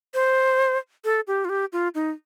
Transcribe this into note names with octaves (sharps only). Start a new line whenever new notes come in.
C5
A4
G4
F4
G4
F4
D#4